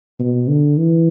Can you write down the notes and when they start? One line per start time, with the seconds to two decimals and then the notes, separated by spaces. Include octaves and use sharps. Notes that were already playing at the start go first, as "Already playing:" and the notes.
0.19 B2
0.48 D3
0.77 E3